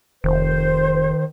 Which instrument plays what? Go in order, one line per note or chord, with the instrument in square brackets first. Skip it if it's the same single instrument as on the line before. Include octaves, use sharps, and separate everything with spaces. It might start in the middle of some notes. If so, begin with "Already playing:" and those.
[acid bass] F1 [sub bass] D#3 [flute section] C5